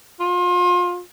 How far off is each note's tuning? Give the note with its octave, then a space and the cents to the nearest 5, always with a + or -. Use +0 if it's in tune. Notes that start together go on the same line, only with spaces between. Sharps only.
F4 +30